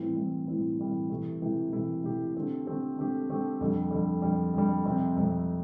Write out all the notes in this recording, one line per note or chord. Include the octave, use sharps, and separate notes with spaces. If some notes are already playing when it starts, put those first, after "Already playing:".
Already playing: A2 E3 G3 C4 E4
A2 E3 G3 C4 E4
A2 E3 G3 C4 E4
A2 E3 G3 C4 E4
C3 E3 A3 E4 G4
C3 E3 A3 E4 G4
C3 E3 A3 E4 G4
C3 E3 A3 E4 G4
D3 A3 C4 G4
D3 A3 C4 G4
D3 A3 C4 G4
D3 A3 C4 G4
F2 D3 G3
F2 D3 G3
F2 D3 G3
F2 D3 G3
F2 C3 G3 C4
F2 C3 G3 C4